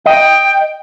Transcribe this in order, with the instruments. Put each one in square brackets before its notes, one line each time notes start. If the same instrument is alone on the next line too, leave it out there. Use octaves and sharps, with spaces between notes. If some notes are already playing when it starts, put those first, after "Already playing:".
[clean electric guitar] D#5 [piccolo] G5